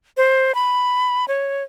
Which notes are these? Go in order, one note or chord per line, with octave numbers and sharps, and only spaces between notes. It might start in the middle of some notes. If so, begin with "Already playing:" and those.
C5
B5
C#5